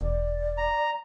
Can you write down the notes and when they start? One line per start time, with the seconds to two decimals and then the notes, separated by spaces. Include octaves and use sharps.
0.01 E1 D5
0.58 A#5